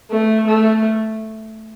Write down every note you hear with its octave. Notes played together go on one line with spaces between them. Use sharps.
A3
A3